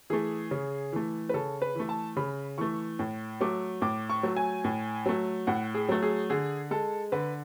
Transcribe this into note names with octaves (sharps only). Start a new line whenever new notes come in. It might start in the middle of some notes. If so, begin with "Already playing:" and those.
E3 A3 G#4
C#3
E3 A3
B4
C#3 A4
B4
E3 A3
A5
C#3 B5
E3 A3 C#6
A2
F#3 A3 D6
A2 D6
C#6
F#3 A3
G#5
A2
F#3 A3
A2 F#5
G#4
F#3 A3
G#4
D3 G#4
G#3 A4
D3 B4